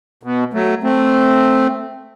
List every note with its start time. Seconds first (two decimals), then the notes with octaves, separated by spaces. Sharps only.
0.23 B2
0.54 F#3 A3
0.83 A3 C4